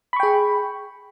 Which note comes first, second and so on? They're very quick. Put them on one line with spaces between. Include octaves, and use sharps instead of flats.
B5 C#6 G5 G#4